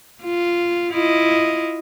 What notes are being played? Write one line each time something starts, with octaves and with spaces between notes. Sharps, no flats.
F4
E4 F4 D#5